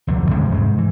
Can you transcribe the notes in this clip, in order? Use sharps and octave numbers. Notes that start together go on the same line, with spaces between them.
C2 F2 D3 F#3
E2 C3 G#3 C#4
G#2 G#3
E3